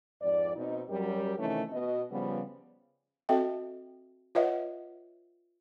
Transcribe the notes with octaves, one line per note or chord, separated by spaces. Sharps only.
F2 G#2 D5
B2 C4 D#4
F#2 F#3 G3 G4 A#4
C3 D#3 E3 A3 C#4
B2 D#5
C#3 F3 G3 B3
C4 F#4 A4 D#5 E5 G5
F4 B4 C#5 D#5 E5 F#5